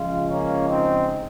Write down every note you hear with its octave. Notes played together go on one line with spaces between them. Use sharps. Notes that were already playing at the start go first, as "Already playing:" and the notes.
Already playing: C#3 F3 G#3 F4
A#3 C#4
C4 D#4